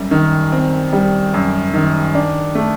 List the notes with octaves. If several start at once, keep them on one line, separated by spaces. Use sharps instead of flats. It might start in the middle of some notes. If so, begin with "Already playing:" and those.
Already playing: F#2 G3
D#3
C4
G3
F#2
D#3
D4
A3